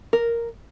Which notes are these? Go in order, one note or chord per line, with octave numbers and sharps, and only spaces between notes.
A#4